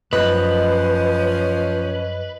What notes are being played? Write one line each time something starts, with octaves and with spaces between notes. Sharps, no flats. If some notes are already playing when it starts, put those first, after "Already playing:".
F#2 F3 C#4 B4 D#5 F#6